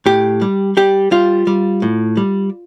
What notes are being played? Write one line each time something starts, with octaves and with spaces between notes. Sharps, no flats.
A2 G4
G3
G3 G4
G3 F4
G3
A2
G3